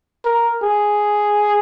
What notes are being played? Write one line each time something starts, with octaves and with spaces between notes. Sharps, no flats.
A#4
G#4